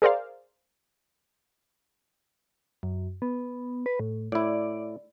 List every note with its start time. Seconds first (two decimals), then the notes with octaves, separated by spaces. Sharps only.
0.02 G#4 A#4 C5 D5 F5
2.83 F#2
3.22 B3
3.86 B4
4.00 A2
4.32 A2 E4 D5